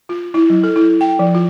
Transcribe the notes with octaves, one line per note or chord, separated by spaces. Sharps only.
F4
E4
F#3
A4
E4
G5
F3
F4